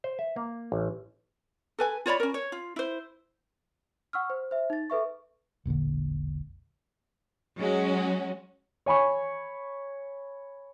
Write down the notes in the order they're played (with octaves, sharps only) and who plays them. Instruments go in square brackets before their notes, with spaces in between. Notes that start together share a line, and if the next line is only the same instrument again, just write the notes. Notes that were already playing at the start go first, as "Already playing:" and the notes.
[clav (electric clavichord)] C5
E5
A#3
A1
[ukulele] A4 B4 G#5
F4 C#5 D5 B5
C#4 A#4
C#5
F4
E4 C5
[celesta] F#5 C#6 E6 F6
C5
C5 E5
D#4 A6
A4 B4 E5 C#6
[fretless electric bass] E1 A#1 A#2 D3
[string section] F#3 G#3 C#4 F#4
[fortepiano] C#5 G#5 B5 C#6